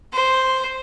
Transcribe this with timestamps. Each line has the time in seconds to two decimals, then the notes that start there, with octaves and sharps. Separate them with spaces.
0.13 C5